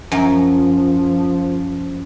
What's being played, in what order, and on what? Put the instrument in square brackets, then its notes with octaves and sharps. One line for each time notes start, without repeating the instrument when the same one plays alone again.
[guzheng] F#2 [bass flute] F3